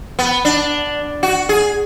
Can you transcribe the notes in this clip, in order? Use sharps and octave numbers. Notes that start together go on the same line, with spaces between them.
B3
D4
F#4
G#4